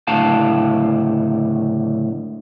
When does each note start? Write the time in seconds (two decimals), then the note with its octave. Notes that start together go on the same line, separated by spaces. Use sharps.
0.08 C#2 A2 D3 A3 F5 A5